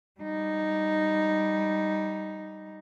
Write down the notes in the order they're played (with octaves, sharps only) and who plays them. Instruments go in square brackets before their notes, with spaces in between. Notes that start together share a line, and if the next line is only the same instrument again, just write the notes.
[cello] G3 D#4